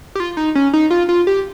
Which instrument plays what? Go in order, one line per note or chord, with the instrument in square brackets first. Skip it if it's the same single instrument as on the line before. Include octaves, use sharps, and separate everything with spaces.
[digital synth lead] G4
F4
D#4
C#4
D#4
F4
F4
G4